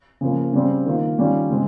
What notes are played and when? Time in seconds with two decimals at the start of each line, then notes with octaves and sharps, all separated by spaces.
0.21 C#3 F3 A#3
0.53 C#3 G3 C4
0.86 D#3 A#3 F4
1.18 D#3 G3 C#4 F4
1.50 C#3 G#3 C4